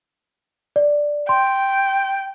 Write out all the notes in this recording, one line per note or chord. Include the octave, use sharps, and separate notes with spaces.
D5
G5 C6